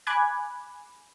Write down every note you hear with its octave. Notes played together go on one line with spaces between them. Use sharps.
G#5 B5 D6 F#6 G#6